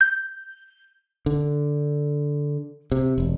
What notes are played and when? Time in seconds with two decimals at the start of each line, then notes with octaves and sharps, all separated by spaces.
0.01 G6
1.26 D3
2.92 C3
3.18 E1